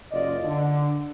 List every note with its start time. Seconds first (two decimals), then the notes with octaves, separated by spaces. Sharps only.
0.12 F#1 F4 D5 D#5
0.45 D3